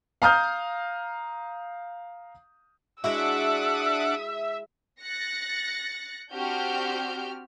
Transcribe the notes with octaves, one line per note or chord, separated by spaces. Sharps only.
F5 A#5 D#6 F6 G6
G#3 D4 E4 F#4 E5 F#5 D6 E6
F#6 A6 A#6 C#7
C4 D4 F#4 G4 F6 G6